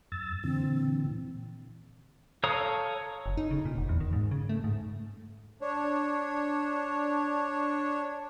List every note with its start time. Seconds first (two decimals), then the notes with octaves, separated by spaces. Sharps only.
0.12 F#2 E6 A6
0.44 A#2 D3 E3 C4
2.44 A4 C#5 F5 A#5 D#6
3.26 F#1
3.37 D#4
3.51 C#3
3.65 A#2
3.78 F1
3.89 E2
4.00 D#3
4.13 G#2
4.31 C#3
4.49 A3
4.64 G#2
5.61 D4 C#5